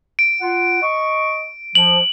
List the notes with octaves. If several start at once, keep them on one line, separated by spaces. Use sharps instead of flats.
D7
F4 F#5
D#5 C#6
F3 F#7